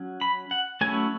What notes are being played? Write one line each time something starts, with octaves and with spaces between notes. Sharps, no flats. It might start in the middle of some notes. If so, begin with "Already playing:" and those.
Already playing: F#3 C#4
B5
F#5
F#3 A3 C#4 E4 G#5